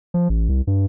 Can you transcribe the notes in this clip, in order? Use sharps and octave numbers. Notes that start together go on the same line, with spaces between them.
F3
A1
C2
G2